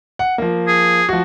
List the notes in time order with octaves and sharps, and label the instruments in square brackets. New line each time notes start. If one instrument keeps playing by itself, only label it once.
[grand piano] F#5
F3 A#3
[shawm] G#4
[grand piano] F3 F#4